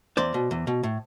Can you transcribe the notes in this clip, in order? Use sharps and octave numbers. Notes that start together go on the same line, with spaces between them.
E2 C5 D5
B2
E2
B2
A2